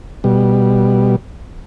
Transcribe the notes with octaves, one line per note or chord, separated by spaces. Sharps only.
B2 G3